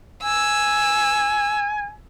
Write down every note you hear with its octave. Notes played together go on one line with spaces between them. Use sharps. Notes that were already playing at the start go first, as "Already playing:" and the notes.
G#5 E6